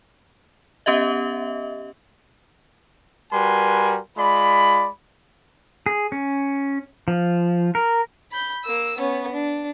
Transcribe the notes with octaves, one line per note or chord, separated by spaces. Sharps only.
B3 C#4 G4 D#5 E5
G3 F#4 A#4 B4 G#5 C6
G#3 F4 D5 B5
G#4
C#4
F3
A#4
B5 G6
A#3 E6
B3 C#4
D4